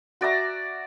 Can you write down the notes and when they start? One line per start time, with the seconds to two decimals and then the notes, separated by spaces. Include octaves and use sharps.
0.21 F#4 D5 E5 A#5